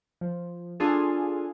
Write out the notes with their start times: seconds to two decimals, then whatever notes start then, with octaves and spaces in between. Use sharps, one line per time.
0.21 F3
0.80 D4 F4 G#4 A4